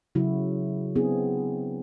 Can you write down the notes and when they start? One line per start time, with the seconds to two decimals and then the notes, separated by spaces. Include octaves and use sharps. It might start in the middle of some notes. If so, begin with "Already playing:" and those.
0.15 C#3 F#3 E4 F#4
0.96 B3 C4 D4 E4 G#4